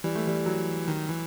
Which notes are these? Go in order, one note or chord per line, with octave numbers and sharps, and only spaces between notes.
E3 G3
A3
G3
F#3
D#3
E3